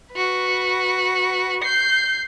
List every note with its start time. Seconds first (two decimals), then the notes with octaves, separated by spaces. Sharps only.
0.12 F#4 B4
1.63 G6 C7